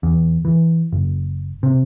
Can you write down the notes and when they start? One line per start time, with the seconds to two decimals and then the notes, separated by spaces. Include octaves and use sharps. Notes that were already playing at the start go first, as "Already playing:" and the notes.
0.03 E2
0.45 E3
0.92 F#1
1.63 C3